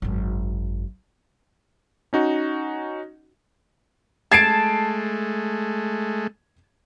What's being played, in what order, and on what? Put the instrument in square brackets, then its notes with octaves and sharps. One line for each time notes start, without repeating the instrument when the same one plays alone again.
[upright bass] G#1 F#2
[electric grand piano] C#4 D#4 F#4
[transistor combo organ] G#3 A3 [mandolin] A5 [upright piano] G#6 C7 D7